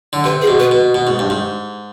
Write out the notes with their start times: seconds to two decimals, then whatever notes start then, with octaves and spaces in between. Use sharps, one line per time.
0.13 D3
0.24 C3 B4
0.42 G#4
0.47 B2
0.59 B4
0.71 B2
0.95 B2
1.07 G#2
1.19 G2
1.30 G#2